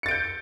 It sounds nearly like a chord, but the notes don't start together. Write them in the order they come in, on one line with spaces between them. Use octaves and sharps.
C#7 A6 D7 G6